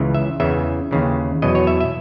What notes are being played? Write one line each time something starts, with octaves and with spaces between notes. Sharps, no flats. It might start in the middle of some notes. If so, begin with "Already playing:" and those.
Already playing: C#2 C#3 E3
E5
E2 C#3 E3 E5
D#2 C#3 E3
E2 B2 F#3 D#5
C#5
E5
E5